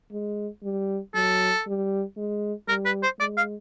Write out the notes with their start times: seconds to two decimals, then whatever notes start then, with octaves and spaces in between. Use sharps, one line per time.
0.12 G#3
0.64 G3
1.15 F#3 A4
1.67 G3
2.17 G#3
2.68 G3 A#4
2.86 B4
3.03 C5
3.19 G#3 D5
3.37 F5